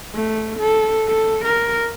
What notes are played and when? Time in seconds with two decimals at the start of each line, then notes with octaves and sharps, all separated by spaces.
0.15 A3
0.59 A4
1.08 A4
1.45 A#4